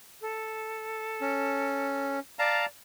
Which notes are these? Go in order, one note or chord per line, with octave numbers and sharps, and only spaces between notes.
A4
C#4
D5 F5 A5 A#5